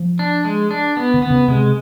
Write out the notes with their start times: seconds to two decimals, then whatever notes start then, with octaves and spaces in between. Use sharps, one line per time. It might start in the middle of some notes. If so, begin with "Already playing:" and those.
Already playing: F3
0.19 D4
0.45 G#3
0.71 D4
0.97 B3
1.14 D3
1.22 B3
1.30 C#3
1.48 C3 G#3